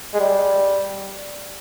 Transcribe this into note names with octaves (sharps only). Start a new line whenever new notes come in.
G#3
G3